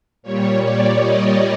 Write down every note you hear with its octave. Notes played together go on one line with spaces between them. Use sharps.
A#2 G3 C#5
D5
D#5